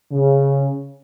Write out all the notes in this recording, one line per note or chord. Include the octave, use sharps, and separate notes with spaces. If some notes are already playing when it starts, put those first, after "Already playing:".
C#3